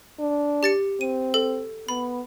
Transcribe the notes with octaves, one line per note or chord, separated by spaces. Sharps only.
D4
G4 A6 C#7
C4 D#7
A4
B3 B5